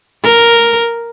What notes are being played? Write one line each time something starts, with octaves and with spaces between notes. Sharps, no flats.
A#4